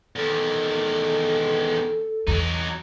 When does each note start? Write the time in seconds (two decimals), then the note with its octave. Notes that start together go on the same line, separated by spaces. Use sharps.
0.16 E2 D#3 A4
2.27 E2 F#3 D4 D#4